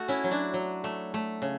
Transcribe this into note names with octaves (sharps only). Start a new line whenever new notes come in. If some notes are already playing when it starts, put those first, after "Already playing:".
Already playing: A3 F#4 A4
C#4 E4
F#3
D4 F#4
F#3
A3
A3
C#3